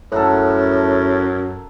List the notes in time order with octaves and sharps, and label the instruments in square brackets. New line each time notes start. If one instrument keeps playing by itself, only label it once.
[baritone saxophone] F#2 [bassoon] A2 [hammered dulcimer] A4 A#4 F#5